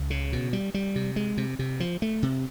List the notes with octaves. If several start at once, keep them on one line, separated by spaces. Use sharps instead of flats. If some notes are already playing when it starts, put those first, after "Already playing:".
Already playing: C#2
C#3
B2
G3
G3
C3
G#3
C3
C3
F3
A3
C3